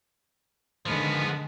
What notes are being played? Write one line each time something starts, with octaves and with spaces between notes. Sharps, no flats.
D3 D#3 F3 G#3 B3